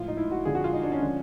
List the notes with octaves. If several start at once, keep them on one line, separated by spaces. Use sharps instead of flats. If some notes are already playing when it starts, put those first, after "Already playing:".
Already playing: A2 F3 F4
D#4
E4
F#4
F2 D3 F3 G#4
F#4
F4
D#4
D4
C#4
D3 F3